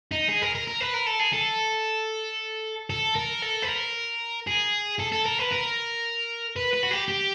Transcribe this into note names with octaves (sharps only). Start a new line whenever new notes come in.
D#4
G#4
A#4
A#4
A#4
B4
A#4
A4
G#4
A4
A4
A#4
A4
B4
A#4
G#4
A4
A4
A#4
B4
A#4
B4
B4
F#4
G4
G4